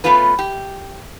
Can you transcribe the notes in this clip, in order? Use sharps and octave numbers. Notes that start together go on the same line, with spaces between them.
A3 B3 C#4 F4 B4
G4